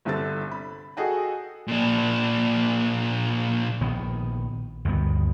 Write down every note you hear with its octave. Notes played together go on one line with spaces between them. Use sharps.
G1 C2 D3 C4 A4 A6
B5
F#4 G#4 A4 D#5 F#5 G5
A#2 D4
A#1 D#3 B3
D2 G2 D#3 B3